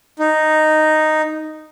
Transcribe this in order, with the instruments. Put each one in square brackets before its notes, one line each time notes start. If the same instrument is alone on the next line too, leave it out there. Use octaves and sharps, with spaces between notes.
[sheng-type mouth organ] D#4